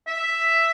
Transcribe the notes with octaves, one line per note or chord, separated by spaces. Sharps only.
E5